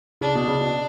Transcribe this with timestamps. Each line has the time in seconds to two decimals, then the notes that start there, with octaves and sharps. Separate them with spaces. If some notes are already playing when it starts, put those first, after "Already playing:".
0.21 C#3 D4
0.35 B2
0.47 C#3
0.61 B2